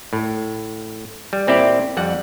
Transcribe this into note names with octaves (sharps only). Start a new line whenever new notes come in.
A2
G3
A#2 C4 E4 G4 D5
F2 G3 F#5